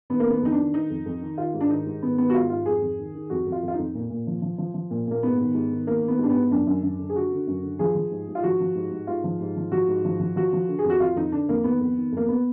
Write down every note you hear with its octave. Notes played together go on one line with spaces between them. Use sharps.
D#3 B3
A#3
D#3
B3
F2 D#4
D4
D#3
D#3 D#4
F2
F2
D#3
D#3 F4
G#2
D4
D#3 D#4
G#2
D#3 B3
D#3 B3
F#4
G#2 F4
G#2 F4
F2 G#4
F2
D#3
D#3
F2 F#4
F2
F4
F2
F4
D#4
F2
A#2
A#2
F3
F3
F3
F3
A#2
A#2 A#3
G#2 B3
D#3
G#2
D#3
D#3 A#3
D#3 B3
G#2 D4
G#2 B3
F#2 D4
F#2
F#2
D3
G#4
D3 F#4
D3
F#2
D3
F3 G#4
F3
G#2
G#2
F4
F3 F#4
F3
G#2
G#2
G#2 F4
F3
G#2
F3
F3 F#4
G#2
F3
F3
F3 F#4
F3
D3
G#4
F2
F#4
F2 F4
F2 D#4
D3 D4
F2 A#3
D#3 B3
F2
D#3
F2 A#3
B3